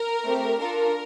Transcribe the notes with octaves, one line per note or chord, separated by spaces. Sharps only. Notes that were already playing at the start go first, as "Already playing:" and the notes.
Already playing: A#4
A3 C4 G4
D4 F4 A4 A#4